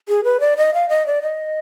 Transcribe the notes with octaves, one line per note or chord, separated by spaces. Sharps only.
G#4
B4
D5
D#5
F5
D#5
D5
D#5